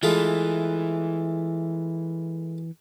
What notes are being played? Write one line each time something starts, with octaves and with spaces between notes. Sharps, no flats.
E3 G#3 A3 F4